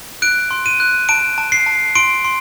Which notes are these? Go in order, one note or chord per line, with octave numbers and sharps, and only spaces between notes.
F#6 D7
C6
D#7
F#6
A5 D7
A5
C7
A5
C6 D7
C6